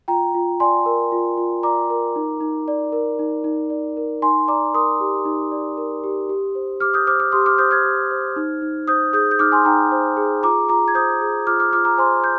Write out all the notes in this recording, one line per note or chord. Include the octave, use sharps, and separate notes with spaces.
F4 G5 A#5
F4
D5 G#5 C6
A#4
F4
F4
D5 A#5 D6
A#4
D#4
D#4
D5
A#4
D#4
D#4
D5
A#4
D#4 G#5 C6
D5 A#5 D6
A#4 C6 D#6
G4
D#4
D5
A#4
G4
G4
C5
G4 D6 F6
D#6 G6
C5 D6 F6
D6 F6
G4 C6 D#6
D6 F6
C5 D#6 G6
F6 G#6
G4
C5
D#4
D#4
C5 D#6 G6
G#4 D#6 G6
G6
D#4 D6 F6
G#5 C6
D#4 G5 A#5
C5
G#4
F4 A#5 D6
F4 A#5 D6
G#6
C5 D#6 G6
G#4
F4 D6 F6
D6 F6
F4 D6 F6
A#5 D6
C5 G#5 C6
G6